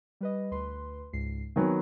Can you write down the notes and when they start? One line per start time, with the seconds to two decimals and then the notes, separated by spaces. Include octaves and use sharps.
0.21 G3 B4 D#5
0.51 D2 B4 C6
1.13 C#2 G#2 C7
1.56 D#3 F#3 B3 C4 G#5